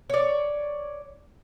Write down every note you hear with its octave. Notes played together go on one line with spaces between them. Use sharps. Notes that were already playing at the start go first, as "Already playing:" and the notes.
C#5 D5